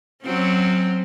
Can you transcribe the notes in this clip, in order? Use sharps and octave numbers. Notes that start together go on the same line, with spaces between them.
F#3 C4 C#4